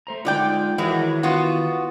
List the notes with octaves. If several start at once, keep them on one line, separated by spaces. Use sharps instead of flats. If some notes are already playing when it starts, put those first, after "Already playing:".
A3 C5 A#5
D3 G#3 D#4 F4 D5 G5
D#3 E3 F#3 G#3 E4 A#4
B3 F4 F#4